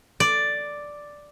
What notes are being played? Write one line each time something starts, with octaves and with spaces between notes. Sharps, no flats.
D5